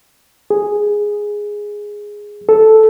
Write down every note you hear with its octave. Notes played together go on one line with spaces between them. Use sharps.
G#4
A4